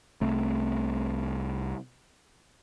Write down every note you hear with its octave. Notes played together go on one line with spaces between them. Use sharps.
C2 C3 A3